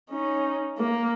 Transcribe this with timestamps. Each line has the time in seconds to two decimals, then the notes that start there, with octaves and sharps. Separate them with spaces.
0.10 C#4 D#4
0.78 A#3